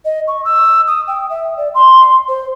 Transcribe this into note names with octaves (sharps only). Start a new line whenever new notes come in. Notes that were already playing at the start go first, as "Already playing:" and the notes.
D#5
C#6
E6
D#6
G5
E5
D5
C6
C5